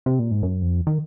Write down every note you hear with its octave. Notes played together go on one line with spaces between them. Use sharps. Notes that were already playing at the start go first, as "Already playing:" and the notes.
C3
A#2
G#2
F#2
F2
D#3